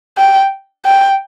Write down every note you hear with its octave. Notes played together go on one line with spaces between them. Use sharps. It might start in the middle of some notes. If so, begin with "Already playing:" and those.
G5
G5